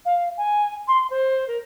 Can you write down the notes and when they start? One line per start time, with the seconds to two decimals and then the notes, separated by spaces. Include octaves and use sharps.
0.05 F5
0.37 G#5
0.87 C6
1.10 C5
1.48 A#4